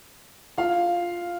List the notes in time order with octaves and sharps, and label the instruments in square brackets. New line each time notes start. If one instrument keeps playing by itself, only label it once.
[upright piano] F4 F5